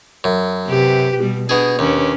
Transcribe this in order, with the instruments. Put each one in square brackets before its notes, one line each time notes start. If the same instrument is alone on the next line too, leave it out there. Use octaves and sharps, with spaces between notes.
[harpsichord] F#2
[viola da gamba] C3 G4 B4
B2 G3
[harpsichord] B2 G#4 [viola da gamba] D4
[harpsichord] D#2 [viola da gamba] C#4 D4 B4